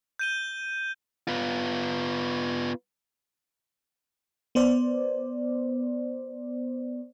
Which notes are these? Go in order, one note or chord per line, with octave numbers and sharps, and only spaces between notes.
G6 D#7 G7
B3 F4
B3 C5 D5